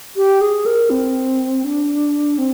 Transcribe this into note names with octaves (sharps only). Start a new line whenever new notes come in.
G4
G#4
A#4
C4
D4
C4